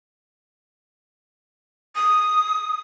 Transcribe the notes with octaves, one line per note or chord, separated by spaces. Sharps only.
D#6